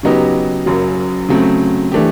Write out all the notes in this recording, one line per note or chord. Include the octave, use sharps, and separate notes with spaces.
C#3 F#3 B3 D#4 G4
F#1 F#2 C#3 F#3
C#3 F#3 A3 C4
E3 A3 D4 G4